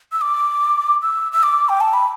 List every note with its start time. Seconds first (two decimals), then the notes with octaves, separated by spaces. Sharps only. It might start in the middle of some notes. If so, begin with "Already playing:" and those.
0.12 E6
0.21 D6
1.02 E6
1.32 E6
1.43 D6
1.69 G5
1.80 A5
1.93 B5